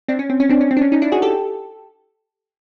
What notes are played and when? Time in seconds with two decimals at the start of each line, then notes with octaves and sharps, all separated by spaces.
0.08 C4 D4
0.19 C#4
0.30 C4
0.40 C#4
0.50 C4 D4
0.61 C#4
0.71 C4
0.77 D4
0.81 C#4
0.92 C#4 D#4
1.02 D4 E4
1.12 F#4 G#4
1.22 G4 A4